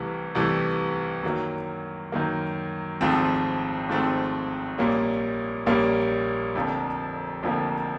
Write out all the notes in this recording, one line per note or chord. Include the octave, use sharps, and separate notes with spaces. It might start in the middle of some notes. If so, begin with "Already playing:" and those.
Already playing: C2 C3 E3 A3
C2 C3 E3 A3
F#2 D#3 F#3 A#3
F#2 D#3 F#3 A#3
G#1 G#2 F3 A3 C4
G#1 G#2 F3 A3 C4
A#1 A#2 G3 A#3 C#4
A#1 A#2 G3 A#3 C#4
F1 F2 D3 F3 A#3
F1 F2 D3 F3 A#3